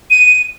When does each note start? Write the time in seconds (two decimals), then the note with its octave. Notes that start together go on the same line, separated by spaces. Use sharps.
0.11 D#7